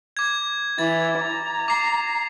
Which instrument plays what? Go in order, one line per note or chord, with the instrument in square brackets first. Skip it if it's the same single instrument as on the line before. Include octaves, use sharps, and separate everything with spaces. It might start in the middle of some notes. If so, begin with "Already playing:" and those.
[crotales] D6 G#6
[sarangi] E3 [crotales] A6
[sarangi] A#5
[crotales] D6 C7